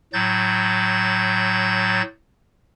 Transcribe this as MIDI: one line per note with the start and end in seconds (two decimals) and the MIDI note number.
0.13 2.02 45
0.13 2.02 54
0.13 2.02 91
0.13 2.02 93